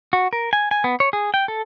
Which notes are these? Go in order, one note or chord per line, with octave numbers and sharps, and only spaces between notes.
F#4
A#4
G#5
G#5
B3
C#5
G#4
G5
A4